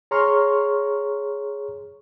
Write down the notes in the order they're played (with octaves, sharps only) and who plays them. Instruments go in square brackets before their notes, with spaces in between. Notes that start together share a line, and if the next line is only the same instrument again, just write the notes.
[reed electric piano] G#4 C#5 A#5 C6 C#6 F6